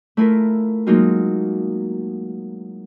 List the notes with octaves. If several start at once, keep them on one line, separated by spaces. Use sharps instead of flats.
A3 E4 F4 A#4
F#3 G#3 A#3 D#4 F4 F#4